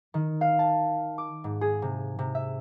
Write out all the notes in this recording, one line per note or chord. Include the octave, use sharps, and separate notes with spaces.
D#3
F5
A5
D6
G#2
G#4
C3
C3
E5